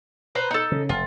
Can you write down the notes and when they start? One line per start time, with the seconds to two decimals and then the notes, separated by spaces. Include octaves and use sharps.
0.35 B4 C5 A#5
0.51 D#4 A4
0.72 C#3
0.89 F1 F4